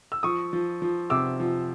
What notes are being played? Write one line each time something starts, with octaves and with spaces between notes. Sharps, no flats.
E6
F3 C#6 D#6
F3
F3
C3 D6 E6
F3